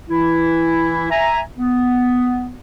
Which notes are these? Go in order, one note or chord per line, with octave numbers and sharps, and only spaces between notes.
E3 E4
E5 G#5 A#5
B3